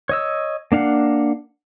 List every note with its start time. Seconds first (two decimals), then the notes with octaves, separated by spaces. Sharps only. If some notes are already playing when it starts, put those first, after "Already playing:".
0.09 C#5 D#5 E6
0.72 A#3 D4 F5 F#5